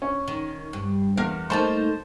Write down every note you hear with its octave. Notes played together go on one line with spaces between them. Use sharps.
C#4
D#3
G2
E2 A#4 F5
A3 A#3 D#4 C5 A5